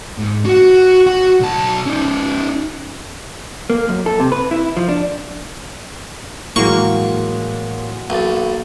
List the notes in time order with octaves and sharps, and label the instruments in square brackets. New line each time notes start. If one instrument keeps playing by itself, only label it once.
[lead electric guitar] G#2
F#4 F#5
F#4 F#5
B1 A5
C#4 D#4
[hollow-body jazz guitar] A#3
F#2
A4
C3
B4
E4
F3
D4
[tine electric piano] A2 [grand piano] E3 F#3 G#3 [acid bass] A#3 [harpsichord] C#6
[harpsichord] B1 [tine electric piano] A#3 A6